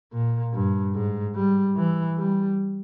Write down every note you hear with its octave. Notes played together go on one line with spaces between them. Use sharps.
A#2
G2
G#2
G3
E3
G3